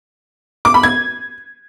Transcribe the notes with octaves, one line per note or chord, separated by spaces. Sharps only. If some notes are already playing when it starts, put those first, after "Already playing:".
D6
B5
G#6